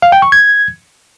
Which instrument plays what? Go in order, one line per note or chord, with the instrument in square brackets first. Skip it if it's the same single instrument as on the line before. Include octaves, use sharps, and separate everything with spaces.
[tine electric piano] F5
G5
C#6
G#6